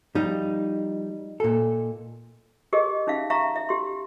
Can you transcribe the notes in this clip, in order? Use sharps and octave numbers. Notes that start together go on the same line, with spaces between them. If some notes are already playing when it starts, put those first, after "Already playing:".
F3 G3 D#4
A#2 A4
G4 G#4 A#4 D#5
C#4 D#4 E5 F5
E5 F5 A#5 C#6
E5
G4 C6